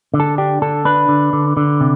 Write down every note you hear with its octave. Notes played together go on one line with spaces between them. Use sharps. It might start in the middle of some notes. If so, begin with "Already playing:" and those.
D3
A4
D4 G4
D3 A4
D4 B4
D3
D3
D3
C3